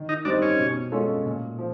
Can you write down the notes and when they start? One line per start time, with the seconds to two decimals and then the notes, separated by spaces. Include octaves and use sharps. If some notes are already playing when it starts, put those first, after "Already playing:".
Already playing: D#3
0.09 D#4
0.25 G3 C4 D4 D#4
0.42 C#4
0.59 B2
0.92 G#3 C#4 F4 A4
1.25 A#2
1.58 F3